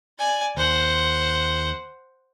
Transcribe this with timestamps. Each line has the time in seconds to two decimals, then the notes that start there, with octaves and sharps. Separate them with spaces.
0.19 D5 G#5
0.57 D#2 C5 F#5